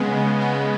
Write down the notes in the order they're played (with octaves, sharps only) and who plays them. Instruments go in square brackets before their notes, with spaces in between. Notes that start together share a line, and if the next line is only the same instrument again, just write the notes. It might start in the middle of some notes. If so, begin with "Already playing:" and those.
Already playing: [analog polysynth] C#3 G#3 B3
C#3
G#3 B3